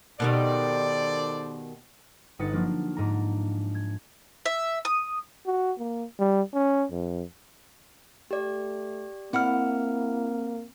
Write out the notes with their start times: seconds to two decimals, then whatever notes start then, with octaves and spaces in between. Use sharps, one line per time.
0.20 B2 D#3 G3 A4 C5 D5
2.39 G1 D#4 B4 F#5 A6 C#7
2.52 F3 F#3 A#3 D4
2.97 G#2 D4 A#5
3.75 G#6
4.46 E5
4.85 D#6
5.46 F#4
5.78 A#3
6.19 G3
6.54 C#4
6.91 F2
8.31 A3 G4 D5
9.33 A#3 C4 E4 F#5 F6